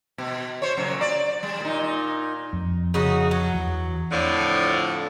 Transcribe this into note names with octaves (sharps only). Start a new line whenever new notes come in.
B2
C5 C#5
A#2 C#3 F#3
D5
G3
A#2 D#4
F2
C#3 D#4 F#4
F#3
E2
F2 A2 D3 F3